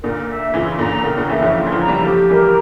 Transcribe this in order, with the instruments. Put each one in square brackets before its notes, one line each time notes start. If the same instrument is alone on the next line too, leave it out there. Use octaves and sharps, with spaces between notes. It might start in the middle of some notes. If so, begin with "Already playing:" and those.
[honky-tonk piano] A#2 D3 [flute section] A#4
[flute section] E5
[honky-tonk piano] C#3 E3 [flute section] F4
[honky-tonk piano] A#2 D3 [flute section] A#5
[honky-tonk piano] A2 C#3 [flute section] A#4
[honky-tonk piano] A#2 D3
[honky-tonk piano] C#3 E3 [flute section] E5
[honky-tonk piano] D3 F3
[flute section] F4
[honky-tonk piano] E3
D3 F3
[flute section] A#5
[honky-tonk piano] E3 G3
[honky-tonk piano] F3 A3 [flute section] G4
[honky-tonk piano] E3 G3 [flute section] A#4